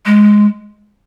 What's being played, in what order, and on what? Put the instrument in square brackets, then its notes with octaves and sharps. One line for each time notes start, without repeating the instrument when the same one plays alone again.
[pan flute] G#3